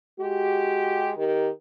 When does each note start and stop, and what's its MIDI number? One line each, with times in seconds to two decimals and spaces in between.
0.20 1.13 56
0.20 1.13 66
0.20 1.13 67
1.17 1.48 51
1.17 1.48 67
1.17 1.48 70